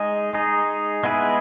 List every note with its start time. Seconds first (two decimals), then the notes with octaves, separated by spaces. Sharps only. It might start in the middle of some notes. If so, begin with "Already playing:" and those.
Already playing: G#3 D#4 G#4 D#5
0.33 G#3 D#4 G#4 D#5
1.04 G#3 B3 E4 G#4 B4